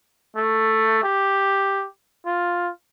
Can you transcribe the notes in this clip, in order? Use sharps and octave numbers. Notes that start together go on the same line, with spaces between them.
A3
G4
F4